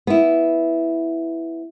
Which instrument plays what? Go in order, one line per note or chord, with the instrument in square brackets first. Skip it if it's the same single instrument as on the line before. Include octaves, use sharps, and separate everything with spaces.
[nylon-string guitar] B3 E4